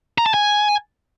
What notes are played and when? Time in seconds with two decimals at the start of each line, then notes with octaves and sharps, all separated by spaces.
0.18 A#5
0.26 A5
0.34 G#5